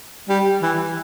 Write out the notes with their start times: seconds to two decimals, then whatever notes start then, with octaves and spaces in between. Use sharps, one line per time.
0.29 G3
0.62 E3